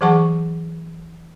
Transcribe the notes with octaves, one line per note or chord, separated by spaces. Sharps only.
E3 F#3 G#4 F#5 A5 C#6